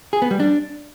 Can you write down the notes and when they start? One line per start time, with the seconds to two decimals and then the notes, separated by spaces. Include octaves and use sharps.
0.13 G#4
0.22 B3
0.31 G3
0.40 D4